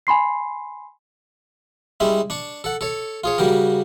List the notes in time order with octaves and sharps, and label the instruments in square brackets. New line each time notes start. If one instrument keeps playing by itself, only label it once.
[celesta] G#5 B5 C6 C7
[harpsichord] G3 G#3 C#4 E4
D4 C#6
A4 F#5
A4 C#5
F4 G#4 C#5
C#3 G3 F#4 G4 A#4